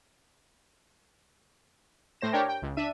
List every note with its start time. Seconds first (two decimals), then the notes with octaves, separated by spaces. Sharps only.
2.21 A2 C5 A#6 E7
2.33 D4 G4 A#4 C#5 G5
2.49 G5
2.62 C#2
2.77 D4 E5 D#7